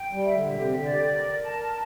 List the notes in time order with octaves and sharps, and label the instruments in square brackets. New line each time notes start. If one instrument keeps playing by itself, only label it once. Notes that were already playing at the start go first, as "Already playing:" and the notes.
Already playing: [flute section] G5
[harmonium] G3
[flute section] E5
[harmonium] D3
A#2
[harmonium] C3 [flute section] G4
[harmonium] D3
[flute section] D5
A#4
A5